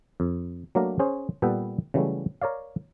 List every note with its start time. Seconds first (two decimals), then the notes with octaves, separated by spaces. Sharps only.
0.20 F2
0.75 F#3 A3 A#3 D4 A#4
0.99 C#4 G#4 C5
1.42 A#2 G3 B3 A4 B4 G5
1.94 C#3 E3 F#3 G3 A3
2.42 A#4 C#5 D5 F5